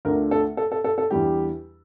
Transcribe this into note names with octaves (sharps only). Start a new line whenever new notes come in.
D2 D3 A3 D4 F4 A#4
A4
A4
A4
A4
A4
E2 E3 G3 D4 G4